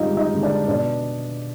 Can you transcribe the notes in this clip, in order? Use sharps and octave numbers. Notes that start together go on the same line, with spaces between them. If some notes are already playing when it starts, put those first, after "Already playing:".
Already playing: G2 D3 G#3 D#4 F4 G4 D#5 F5
D#4 D#5
D3 G#3
D4 D5
B2 D4 D5